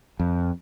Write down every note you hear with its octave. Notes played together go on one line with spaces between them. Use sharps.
F2